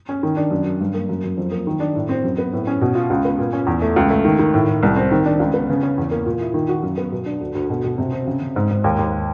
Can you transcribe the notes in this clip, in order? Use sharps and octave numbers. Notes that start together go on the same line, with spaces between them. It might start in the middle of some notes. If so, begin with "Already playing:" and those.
C#4
D#3
D4
F#2
F#2
G2
A#3
F#2
F#2
F2
A#3
D#3
D4
A2
C4
F#2
B3
A2
C#4
B2
F4
C#2
B3
A#2
C#4
E2
A3
C#2
A3
D#3
D#3
A2
A2
C2
C4
D#3
D4
C#2
B3
C#3
C#4
E2
A#3
A#2
E4
D#3
F#4
F#2
B3
B2
D4
D2
D2
B2
B2
C3
C4
C#3
C#3
G#2
G#2
D#2
D#2